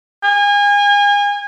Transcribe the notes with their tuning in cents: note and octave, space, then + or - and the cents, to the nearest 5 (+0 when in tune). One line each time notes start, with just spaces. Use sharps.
G#5 -30